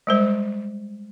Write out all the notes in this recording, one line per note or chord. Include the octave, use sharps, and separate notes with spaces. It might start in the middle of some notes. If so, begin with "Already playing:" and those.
G3 G#3 C5